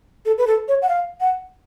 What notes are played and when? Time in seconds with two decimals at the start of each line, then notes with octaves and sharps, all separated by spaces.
0.26 A4
0.38 B4
0.47 A4
0.68 C#5
0.82 F#5
0.89 F5
1.21 F#5